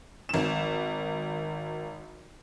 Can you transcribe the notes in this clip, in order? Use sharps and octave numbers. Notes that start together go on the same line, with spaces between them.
G#1 E7